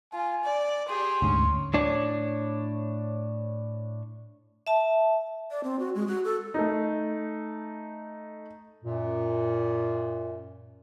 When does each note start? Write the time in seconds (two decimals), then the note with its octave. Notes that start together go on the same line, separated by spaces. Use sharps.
0.13 F4 G#5
0.44 D5
0.89 G4 G#4 C6
1.22 D2 G#2 C#4
1.74 A2 D4 C#5
4.67 E5 A5
5.51 D5
5.64 C4
5.79 F#4
5.95 G#3
6.07 F#4
6.25 A4
6.54 A3 D#4
8.83 F#2 A#2